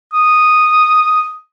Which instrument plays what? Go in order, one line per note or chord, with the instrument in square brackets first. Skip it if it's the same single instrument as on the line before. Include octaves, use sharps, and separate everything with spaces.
[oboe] D#6